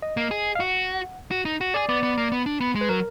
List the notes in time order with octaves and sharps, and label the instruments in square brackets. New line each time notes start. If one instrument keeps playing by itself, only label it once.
[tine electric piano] D#5
[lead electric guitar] A#3
G#4
[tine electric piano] F5
[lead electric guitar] F#4 [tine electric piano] F#5
[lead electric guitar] F#4
D#4
F#4
[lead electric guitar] G#4 [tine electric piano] D5
[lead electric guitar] B3 [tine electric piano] D5
[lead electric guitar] B3
A#3
B3
D4
B3
G#3
[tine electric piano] B4
[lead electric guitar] F#3 [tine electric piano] A#4